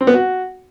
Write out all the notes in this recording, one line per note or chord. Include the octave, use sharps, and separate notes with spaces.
C4
B3
F#4